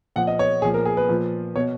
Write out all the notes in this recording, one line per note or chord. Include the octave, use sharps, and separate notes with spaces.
A#2 F3 F#5
D#5
C#5
A#2 F3 G#4
A#4
G#4
B4
A#2 F3
B2 C#5